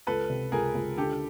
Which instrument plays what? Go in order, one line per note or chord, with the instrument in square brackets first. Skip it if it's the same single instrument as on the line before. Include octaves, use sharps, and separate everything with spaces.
[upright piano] C#2 [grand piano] A4 B4
[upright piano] C3
[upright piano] C#2 [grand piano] G#4 A#4
[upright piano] C#2
[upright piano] D3 [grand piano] G4 A4